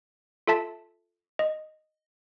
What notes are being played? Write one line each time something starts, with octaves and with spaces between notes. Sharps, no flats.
F4 A4 E5 A5 B6
D#5